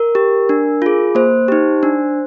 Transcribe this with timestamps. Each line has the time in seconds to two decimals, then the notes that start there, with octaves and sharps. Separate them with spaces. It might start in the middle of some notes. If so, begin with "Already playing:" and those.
Already playing: A#4
0.15 G4
0.49 D4
0.82 F4 G#4
1.15 A#3 C5
1.48 D#4 G4
1.83 D4